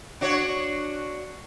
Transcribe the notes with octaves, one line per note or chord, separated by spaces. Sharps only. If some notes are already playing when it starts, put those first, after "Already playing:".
D4 F#4 C#5